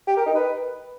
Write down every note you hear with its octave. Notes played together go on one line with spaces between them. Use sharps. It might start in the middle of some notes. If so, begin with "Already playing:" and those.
G4
A#4
D#4
B4